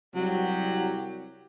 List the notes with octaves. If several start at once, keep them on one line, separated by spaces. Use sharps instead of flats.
C2 F#3 F#4 G4